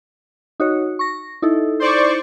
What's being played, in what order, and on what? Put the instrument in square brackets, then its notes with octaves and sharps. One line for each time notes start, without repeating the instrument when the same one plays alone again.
[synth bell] D#4 F#4 C#5
C#6 A#6
D#4 E4 A4
[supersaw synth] C5 D5 C#6